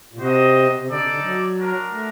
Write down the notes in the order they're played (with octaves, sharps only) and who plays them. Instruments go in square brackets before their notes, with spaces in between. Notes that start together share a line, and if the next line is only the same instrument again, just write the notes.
[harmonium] A#2
[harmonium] C3 [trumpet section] F#4 C5 D#5
[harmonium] C3
[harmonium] D3 [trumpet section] D#4 A4 D5
[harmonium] C3
D3
F#3
[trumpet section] D4 F#4 A#4
[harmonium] A3